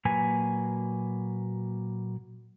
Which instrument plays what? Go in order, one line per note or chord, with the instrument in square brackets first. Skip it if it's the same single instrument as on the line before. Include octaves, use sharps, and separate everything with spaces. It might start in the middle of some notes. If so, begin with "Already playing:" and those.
[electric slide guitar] A#2 F#3 A#3 B4 G#5